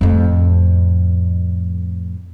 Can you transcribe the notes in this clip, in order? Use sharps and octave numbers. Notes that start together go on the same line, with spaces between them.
F2 A2